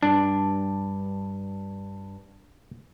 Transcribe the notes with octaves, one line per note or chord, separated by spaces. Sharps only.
G2 D4